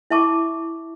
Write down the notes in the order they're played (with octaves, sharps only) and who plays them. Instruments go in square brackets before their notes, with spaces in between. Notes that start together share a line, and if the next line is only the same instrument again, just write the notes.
[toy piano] E4 E5 A5 C#6 D6